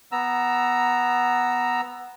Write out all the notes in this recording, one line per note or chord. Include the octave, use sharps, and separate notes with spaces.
B3 A#5 E6